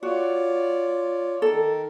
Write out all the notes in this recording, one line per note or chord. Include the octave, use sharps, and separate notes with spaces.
F4 F#4 C#5 D5
D#3 A4 A#4